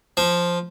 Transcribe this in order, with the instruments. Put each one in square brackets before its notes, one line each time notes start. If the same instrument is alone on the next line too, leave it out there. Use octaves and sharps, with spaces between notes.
[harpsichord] F3